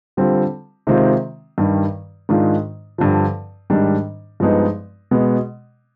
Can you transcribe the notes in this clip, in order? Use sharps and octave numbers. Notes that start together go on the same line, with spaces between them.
D3 G3 C4 F4
C3 D#3 G#3 C4 F4
G2 D#3 G3
G#2 D#3 G#3 D4 F4
G2 D3 F3
G#2 D#3 G3 D4
G2 F3 G#3 B3 D#4
B2 G#3 B3